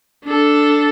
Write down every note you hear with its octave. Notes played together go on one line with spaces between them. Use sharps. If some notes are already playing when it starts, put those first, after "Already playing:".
D4 A4